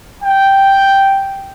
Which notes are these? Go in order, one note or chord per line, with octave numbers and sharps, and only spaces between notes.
G5